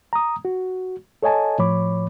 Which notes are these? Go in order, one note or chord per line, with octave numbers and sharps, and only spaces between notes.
A#5 D#6
F#4
A4 C#5 D#5 G#5 A5
A2 F3 C#5 B5 D6